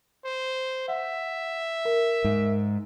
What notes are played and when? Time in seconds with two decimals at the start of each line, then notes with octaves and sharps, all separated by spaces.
0.25 C5
0.88 E5 F#5
1.85 A#4
2.24 G#2